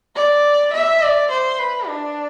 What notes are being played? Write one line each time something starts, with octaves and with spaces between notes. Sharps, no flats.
D5
E5
D5
C5
B4
D4